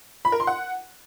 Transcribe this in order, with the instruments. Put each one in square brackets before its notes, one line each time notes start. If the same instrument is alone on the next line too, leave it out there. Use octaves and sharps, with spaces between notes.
[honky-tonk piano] B5
A#4
C6
F#5